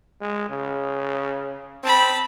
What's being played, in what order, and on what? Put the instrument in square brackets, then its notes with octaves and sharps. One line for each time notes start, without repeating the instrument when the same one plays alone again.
[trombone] G#3
C#3
[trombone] C4 [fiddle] A5 B5